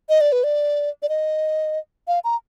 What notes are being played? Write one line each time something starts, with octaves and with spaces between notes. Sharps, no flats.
D#5
D5
B4
D5
D5
D#5
F5
A#5